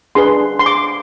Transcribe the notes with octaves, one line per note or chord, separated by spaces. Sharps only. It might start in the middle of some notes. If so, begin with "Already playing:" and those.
D4 G#4 B4 C6
C6
D6